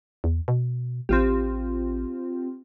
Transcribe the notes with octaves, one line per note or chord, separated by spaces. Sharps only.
E2
B2
A1 C4 F4 G4